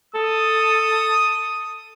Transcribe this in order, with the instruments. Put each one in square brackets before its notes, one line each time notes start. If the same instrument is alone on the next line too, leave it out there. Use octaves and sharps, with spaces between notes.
[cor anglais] A4 [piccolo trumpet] D#6